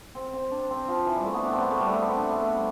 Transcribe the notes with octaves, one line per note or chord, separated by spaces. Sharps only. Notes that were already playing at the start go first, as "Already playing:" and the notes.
C4
C4
D4
C4
F3
E3
G3
A3
B3
D4
C4
B3
A3
G3
A3
B3
C4
D4
B3
A3
G3